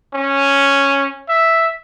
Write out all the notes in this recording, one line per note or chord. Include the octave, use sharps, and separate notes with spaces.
C#4
E5